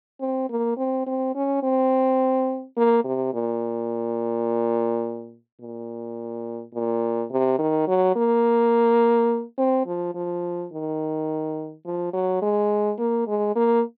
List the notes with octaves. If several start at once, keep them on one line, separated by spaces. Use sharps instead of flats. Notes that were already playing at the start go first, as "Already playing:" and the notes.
C4
A#3
C4
C4
C#4
C4
A#3
C3
A#2
A#2
A#2
C3
D#3
F#3
A#3
C4
F3
F3
D#3
F3
F#3
G#3
A#3
G#3
A#3